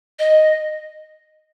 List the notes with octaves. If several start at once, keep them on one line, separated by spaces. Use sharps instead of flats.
D#5